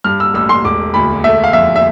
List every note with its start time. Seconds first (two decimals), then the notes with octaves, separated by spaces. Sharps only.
0.04 G2 F6
0.20 E6
0.34 A1 E6
0.49 C6
0.65 E1 D6
0.94 D2 B5
1.24 A3 E5
1.44 F5
1.53 F2 E5
1.76 E5